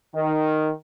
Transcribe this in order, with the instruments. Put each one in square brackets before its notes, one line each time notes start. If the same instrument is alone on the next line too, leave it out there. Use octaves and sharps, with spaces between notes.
[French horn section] D#3